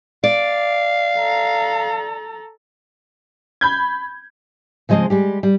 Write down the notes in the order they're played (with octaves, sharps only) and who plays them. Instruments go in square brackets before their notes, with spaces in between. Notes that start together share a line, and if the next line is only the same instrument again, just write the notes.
[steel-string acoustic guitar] D5 [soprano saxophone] F5
[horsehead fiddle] A4 A#5
[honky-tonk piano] B5 G6 G#6
[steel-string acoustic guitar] C#3 F3 G#3 C4 D#5
G3 G#3 G4
G3